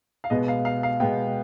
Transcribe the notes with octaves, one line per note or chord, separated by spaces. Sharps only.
F5
B2 G#3 B3 D#5
F5
F5
F5
B2 G#3 B3 G5